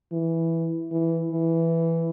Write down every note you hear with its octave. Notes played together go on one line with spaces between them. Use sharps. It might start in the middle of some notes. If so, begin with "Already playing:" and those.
E3
E3
E3